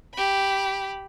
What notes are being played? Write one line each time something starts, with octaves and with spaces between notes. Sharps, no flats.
G4 B5